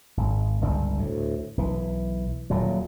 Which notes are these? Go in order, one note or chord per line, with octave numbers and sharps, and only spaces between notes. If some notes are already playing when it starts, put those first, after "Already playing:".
G#1
G1 C#2 G2 G3
D2 A2
B1 E3
D#1 A#2 F#3